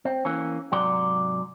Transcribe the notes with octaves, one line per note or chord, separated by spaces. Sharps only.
C4
E3 A#3 C#4
G#2 C3 F#3 D5 C6